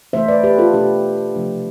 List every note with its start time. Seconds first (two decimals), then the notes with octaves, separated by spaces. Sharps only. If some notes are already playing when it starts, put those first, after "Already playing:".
0.13 E3 A3 D4 C5 E5
0.28 B4 D5
0.43 G4 B4
0.58 F4 A4
0.74 B2 A3 D4 F4 G4
1.34 C3 F3 A3 D4